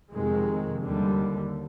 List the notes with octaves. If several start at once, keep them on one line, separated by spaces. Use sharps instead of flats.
F2 C3 D#3 G#3
D#2 D3 G3